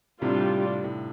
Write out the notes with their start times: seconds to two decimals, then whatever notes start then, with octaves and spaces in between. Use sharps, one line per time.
0.21 A2 C3 G3 D4 F4
0.84 A2